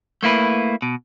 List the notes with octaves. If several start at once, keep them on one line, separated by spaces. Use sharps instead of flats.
A3 A#3 E4 B4
B2